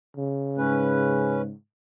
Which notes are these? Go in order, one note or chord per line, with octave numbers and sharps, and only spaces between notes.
C#3
G#2 C#4 B4